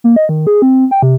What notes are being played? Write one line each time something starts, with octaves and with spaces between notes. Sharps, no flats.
A#3
D#5
D#3
G#4
C4
G5
C3